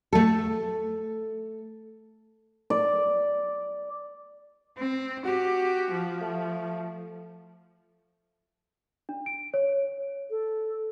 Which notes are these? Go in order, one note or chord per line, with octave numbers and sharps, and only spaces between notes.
A3 A4
D5
C4
F#4 G4
F3
A3
D4
D7
C#5
A4